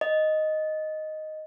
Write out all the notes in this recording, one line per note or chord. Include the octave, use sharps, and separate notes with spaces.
D#5